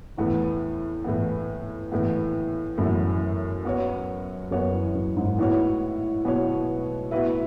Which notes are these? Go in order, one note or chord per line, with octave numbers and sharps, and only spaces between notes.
E2 A2 E3 B3
A2 E3 B3
A2 E3 B3
F#2 A2 E3 B3
B3 F#4 C#5
F#2 B3 F#4 C#5
E2
F#2
G#2
A2 B3 F#4 C#5
B2 B3 F#4 C#5
A2 B3 F#4 B4 E5